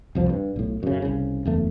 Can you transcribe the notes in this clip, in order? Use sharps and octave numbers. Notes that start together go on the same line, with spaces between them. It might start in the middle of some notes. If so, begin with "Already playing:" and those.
C2 F2 F3
G2
B1 A2
F#2 C#3
C2 C#3
F#1 E2 A3